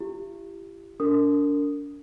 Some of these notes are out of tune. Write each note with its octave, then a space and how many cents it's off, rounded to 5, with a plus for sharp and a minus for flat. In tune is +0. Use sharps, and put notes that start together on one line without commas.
E4 +45 G4 +0
D4 -35 A#4 -30 D#6 +0